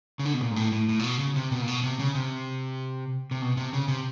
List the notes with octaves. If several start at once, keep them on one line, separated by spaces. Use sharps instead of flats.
C#3
D3
B2
A#2
G#2
A2
A2
A2
A#2
B2
C#3
C3
B2
A#2
B2
C3
C#3
C3
C3
B2
C3
C#3
C3